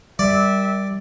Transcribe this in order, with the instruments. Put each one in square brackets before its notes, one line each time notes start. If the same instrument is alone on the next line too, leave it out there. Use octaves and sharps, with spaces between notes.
[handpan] G3 [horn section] G4 A#4 E5 [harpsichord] D5